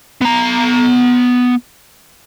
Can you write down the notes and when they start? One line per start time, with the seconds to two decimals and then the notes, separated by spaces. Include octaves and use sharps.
0.21 B3 A#5